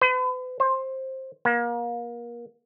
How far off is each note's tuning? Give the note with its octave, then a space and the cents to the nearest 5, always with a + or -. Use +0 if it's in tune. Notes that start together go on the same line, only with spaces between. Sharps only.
B4 +45
C5 +15
A#3 +30